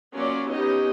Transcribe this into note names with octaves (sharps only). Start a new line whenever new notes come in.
F#3 A#3 C#4 F4 D5
B3 C#4 D#4 G4 D#5